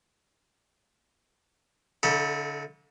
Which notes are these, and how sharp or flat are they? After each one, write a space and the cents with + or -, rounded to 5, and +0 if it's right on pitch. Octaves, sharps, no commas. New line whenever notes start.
D3 -35 E4 -40 A4 +15